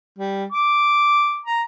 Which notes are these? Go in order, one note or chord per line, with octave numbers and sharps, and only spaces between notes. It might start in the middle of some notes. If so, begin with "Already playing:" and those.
G3
D6
A#5